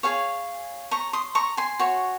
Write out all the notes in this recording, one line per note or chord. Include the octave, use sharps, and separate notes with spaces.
G#4 C#5 F5 G#5
A#5 C#6
C6 D#6
A#5 C#6
G#5 C6
F#4 C#5